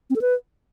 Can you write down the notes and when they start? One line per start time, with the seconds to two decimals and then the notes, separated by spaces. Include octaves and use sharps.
0.10 C4
0.16 A4
0.21 B4